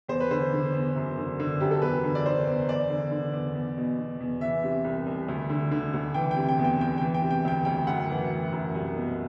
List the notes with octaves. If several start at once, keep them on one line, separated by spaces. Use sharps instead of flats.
E2 C5
B4
D3 C5
D3
E2
F#2
D3
D3
F#2 G4
A4
E2 B4
D3
D5
D3 C5
E2
E2 D5
D3
D3
E2
E2
B2
B2
E2
E3 E5
C3
C2
C2
D2
D3
D3
D2
E3 G5
G5
C3
G5
E2
G5
E2 G5
G5
E3
G5
C3
G5
D2 G5
D2 G5
F#2 F#5
E3
E3
F#2
C2
B2